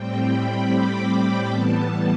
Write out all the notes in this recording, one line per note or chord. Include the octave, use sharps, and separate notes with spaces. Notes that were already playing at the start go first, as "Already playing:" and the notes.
Already playing: A2 G3 C4 G5
B5
D6
A2 E3 G3 B3 A5